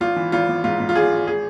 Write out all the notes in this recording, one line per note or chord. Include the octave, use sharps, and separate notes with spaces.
G#1 F4
E3
G#1 F4
G#1
G#2 F4
G#2
F4
G#1 G#4
G#1
G#4